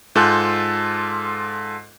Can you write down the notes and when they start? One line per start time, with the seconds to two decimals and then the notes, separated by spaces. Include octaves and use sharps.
0.15 G#2 F4 A4 G#5 F#6 G6